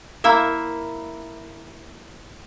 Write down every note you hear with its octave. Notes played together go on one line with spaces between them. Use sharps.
A#3 E4 E5